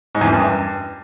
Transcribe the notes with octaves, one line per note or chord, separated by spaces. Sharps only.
G#2
E2
F#2
G2